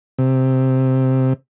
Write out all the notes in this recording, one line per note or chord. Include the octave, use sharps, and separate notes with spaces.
C3